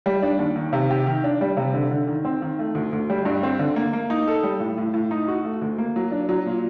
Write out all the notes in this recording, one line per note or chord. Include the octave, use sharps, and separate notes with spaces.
G3
D4
D#2
D#3
C3
G4
D#3
D4
G3
C3
D3
D3
D#3
C4
D#3
A3
D2
D2
G3
G2
C4
D3
A#3
A#3
D#4
A4
G3
A2
A2
A2
D#4
F#4
A3
D2
A#3
F#3
D4
F#3
A#2